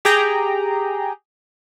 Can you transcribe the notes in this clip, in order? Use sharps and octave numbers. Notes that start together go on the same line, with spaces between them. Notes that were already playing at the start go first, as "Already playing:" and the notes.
G4 G#4 G5 A#5